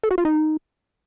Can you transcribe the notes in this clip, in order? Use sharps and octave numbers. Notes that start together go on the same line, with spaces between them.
A4
F#4
F4
D#4